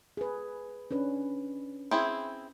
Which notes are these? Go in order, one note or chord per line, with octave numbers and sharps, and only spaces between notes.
G#4 B4
C#4 D4 B4
C4 E4 G#4